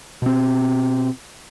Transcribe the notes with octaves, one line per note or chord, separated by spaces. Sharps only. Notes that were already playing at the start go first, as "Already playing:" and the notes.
B2 C4